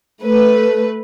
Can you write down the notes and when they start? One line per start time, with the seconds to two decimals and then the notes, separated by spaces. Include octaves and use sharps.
0.23 A3 B4